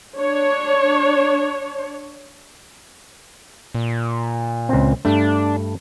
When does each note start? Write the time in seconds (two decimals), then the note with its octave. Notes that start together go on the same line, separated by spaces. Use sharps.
0.17 D4 C#5
3.75 A#2
4.69 C#2 C4
5.05 G2 A3 D4